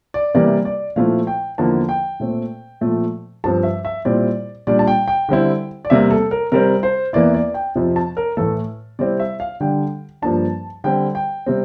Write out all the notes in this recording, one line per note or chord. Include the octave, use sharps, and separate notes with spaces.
D5
C3 E3 G3 A#3 D5
D5
A#2 F3 A3 C4 E4 F5
G5
E2 D3 F3 A#3 E4 A5
G5
A#2 A3 C4
A#2 F3 A3 C4
G2 F3 C4 A5
E5
E5
A#2 G3 C4 E4 D5
A#2 G3 D4 D5
A5
G5
G5
D3 G3 C4 E4
D5
E2 C3 G3 A#3 E5
A4
A#4
C3 G3 C4 A#4
C5
E2 E3 A#3 E4 D5
D5
G5
F2 C3 F3
A5
A#4
A2 E3 A3 A4
C3 G3 C4 E4 D5
E5
F5
D3 G3 D4 G5
G2 F3 A#3 D4 A5
D3 G3 C4 G5
G5
C3 G3 C4